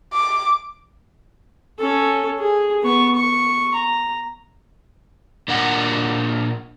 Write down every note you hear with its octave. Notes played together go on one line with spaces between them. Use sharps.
D6
C#4 A4
G#4
B3 C#6
C#6
A#5
A#2 D4 A#4 F#5